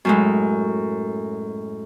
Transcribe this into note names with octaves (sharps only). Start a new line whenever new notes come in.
F#2 A2 G#3